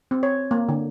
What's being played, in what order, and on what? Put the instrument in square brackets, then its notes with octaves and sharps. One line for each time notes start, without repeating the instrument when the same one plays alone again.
[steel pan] C4
C#5
A#3
D3